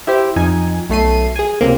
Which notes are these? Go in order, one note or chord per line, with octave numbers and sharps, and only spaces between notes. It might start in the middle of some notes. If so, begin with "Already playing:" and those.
E4 G4 C5
F2 D#4 G#5
B1 A3 C7 D#7
G#4 G#5
C#2 C3 A#3